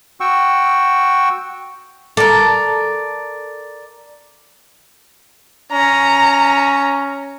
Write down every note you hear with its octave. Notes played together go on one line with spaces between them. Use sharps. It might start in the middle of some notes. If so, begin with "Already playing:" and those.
F#4 G5 C#6 E6
A4 A#4 D5
C#4 A#5